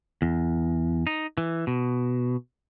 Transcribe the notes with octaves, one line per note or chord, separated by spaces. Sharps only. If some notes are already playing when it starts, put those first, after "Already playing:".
E2
D#4
E3
B2